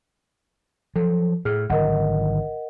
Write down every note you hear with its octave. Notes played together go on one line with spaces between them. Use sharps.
F3 F#3 A4
A2 G#4 F6
G#1 D3 F#3 A#4 D#5 F#5